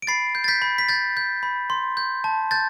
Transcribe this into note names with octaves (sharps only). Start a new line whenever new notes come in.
D7
B5 A6 C7
G6
A6
G6 B6
B5
B6
G6 A6
G6
B5
C6
G6
A5
G6 A6